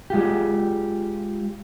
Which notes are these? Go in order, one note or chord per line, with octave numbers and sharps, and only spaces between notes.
G#3 F4 G4